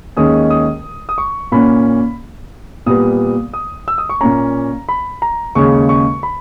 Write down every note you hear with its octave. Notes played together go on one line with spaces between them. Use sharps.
D#2 D#3 G#3 C#4 D#6
D#6
D#6
C#6
A#2 A#3 C#4 B5
A#2 G3 B3 D#6
D#6
E6
D#6
C#6
A#2 A#3 C#4 A#5
B5
A#5
D#2 C#3 G#3 C#4 C#6
C#6
B5